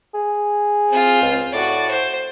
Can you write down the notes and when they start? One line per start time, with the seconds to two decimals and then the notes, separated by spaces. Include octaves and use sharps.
0.14 G#4
0.89 C4 F4
1.21 C#2
1.53 A2 F#4 D5
1.91 C5